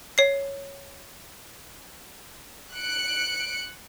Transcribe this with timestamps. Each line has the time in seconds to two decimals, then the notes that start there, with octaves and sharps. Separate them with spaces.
0.18 C#5 C7
2.74 F#6 C#7 D7